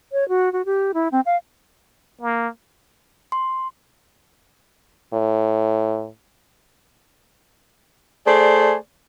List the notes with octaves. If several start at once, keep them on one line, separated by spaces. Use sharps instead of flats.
C#5
F#4
F#4
G4
E4
C4
F5
A#3
C6
A2
A3 G#4 C5 D5